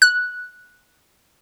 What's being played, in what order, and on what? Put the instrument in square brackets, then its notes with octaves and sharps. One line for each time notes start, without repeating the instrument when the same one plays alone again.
[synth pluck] F#6